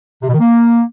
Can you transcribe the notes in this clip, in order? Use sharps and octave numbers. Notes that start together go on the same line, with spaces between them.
C3
B2
D#3
A#3